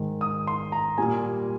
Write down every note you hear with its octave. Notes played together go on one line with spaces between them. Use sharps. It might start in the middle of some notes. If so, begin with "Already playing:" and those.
Already playing: G#2 D#3 G#3
D#6
C6
A#5
A#2 G3 G#5